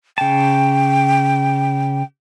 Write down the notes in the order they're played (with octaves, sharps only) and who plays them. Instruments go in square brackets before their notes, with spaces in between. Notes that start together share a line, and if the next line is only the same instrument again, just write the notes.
[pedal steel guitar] C#3 A5 [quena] G5